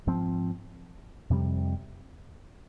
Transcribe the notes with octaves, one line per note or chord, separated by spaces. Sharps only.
G#2 F3 C4
F2 C3 G3